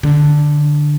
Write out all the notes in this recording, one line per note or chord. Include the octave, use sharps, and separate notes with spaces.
D3